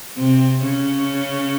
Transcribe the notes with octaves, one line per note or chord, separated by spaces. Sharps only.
C3 C4
C#3 C#4